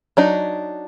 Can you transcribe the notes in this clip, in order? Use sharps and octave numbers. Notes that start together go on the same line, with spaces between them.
F#3 D4 D#4